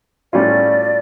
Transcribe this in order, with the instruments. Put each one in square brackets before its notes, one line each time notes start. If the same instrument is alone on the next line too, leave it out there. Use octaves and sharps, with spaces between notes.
[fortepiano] A2 G3 C#4 F4 [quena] D5